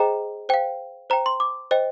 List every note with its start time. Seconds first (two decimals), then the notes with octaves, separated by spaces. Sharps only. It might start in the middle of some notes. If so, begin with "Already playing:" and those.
Already playing: G#4 C5 D#5 G5 A#5
0.49 C5 F5 G5
1.10 C5 G5 A#5
1.26 C6
1.40 D6
1.71 C5 D#5 G5